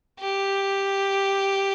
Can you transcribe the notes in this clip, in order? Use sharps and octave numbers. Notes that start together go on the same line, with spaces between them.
G4